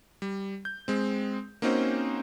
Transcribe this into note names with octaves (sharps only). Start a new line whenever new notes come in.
G3
G6
G#3 C4
A#3 C4 C#4 D#4 F#4 C5